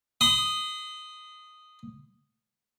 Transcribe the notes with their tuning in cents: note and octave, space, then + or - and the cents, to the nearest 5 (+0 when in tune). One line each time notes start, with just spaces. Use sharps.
C6 -40 D#6 -5